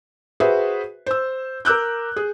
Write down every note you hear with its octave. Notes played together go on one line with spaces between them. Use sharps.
F#4 G#4 B4 C5 E5
C5 E6
A#4 D6 E6 F#6 G6
G#4